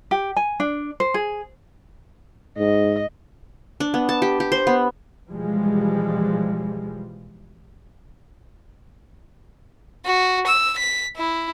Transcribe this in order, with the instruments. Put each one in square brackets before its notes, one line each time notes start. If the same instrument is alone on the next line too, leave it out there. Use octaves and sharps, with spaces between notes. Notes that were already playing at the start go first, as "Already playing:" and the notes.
[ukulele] G4
G#5
D4
C5
G#4
[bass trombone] G#2 [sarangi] D#5
[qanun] D4
B3
A5
G4
G4
C5
B3
[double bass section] B2 E3 F3 G3 G#3
[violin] F#4
E6
B6
E4